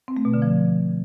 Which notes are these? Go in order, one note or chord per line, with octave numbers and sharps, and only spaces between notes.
C4
A3
B2
D3
F3